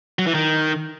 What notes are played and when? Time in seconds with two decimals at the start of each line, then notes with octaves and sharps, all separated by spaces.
0.19 F#3
0.27 E3
0.35 D#3